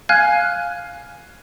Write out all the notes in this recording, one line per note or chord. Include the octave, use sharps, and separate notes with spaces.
F5 G#5 F6 F#6 G#6